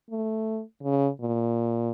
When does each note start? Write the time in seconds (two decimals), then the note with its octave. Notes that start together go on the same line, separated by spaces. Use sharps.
0.10 A3
0.83 C#3
1.21 A#2